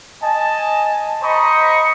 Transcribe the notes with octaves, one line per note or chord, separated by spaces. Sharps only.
D#5 G#5 A5
C5 D#5 A#5 B5 C#6 D#6